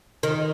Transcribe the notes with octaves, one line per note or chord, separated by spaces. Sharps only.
D#3